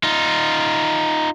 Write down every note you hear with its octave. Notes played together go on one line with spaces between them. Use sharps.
D#4 F4